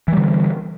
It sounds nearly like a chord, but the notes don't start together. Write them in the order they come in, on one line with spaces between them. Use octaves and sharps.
E3 G3 D3